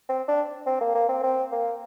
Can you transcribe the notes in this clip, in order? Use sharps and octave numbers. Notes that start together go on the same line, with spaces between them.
C4
D4
C4
A#3
A#3
C4
C4
A#3